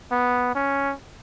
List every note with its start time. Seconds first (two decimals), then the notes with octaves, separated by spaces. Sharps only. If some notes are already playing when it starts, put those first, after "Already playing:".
0.12 B3
0.55 C#4